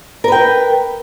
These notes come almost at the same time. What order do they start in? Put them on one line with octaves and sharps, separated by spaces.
A#4 B4 G5